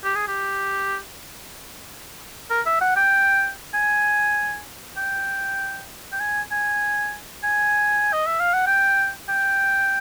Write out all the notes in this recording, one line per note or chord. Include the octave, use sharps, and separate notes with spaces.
G4
G#4
G4
A#4
E5
F#5
G5
G#5
G5
G5
G#5
G#5
G#5
D#5
E5
F5
F#5
G5
G5